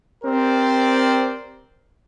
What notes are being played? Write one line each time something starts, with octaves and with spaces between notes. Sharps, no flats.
C4 G4 A#4 C5 D5